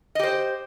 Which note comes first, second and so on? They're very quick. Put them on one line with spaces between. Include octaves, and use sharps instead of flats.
D#5 G4 C5